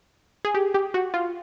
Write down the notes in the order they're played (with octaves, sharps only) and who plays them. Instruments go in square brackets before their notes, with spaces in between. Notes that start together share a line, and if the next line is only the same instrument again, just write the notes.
[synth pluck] G#4
G4
G4
F#4
F4